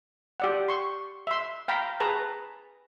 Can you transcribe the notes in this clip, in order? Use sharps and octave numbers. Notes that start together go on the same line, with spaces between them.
G4 D5 F#5
C6 C#6
E5 C6
F5 G5 A#5 B5
G#4 B4 A5 A#5